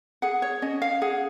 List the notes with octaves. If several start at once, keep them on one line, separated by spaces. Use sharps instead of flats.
G#4 F#5
C#5
C#4 D#5
F5
G#4 F#5